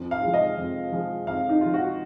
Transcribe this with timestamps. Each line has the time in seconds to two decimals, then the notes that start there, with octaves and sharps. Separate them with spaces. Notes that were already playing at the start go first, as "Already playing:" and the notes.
Already playing: F2
0.11 F5
0.23 F3 G#3
0.33 D#5
0.57 F2
0.92 F3 G#3
1.27 F2 F5
1.49 D#4
1.61 F3 G#3 F4
1.74 F#4